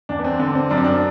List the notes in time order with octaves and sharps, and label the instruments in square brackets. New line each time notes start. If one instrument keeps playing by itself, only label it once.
[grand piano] E2 D4
B3
C4
D3 C4
C4
F#2 D4
C4
D4